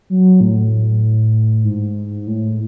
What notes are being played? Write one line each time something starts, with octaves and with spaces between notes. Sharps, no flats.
F#3
A2
G#2
A2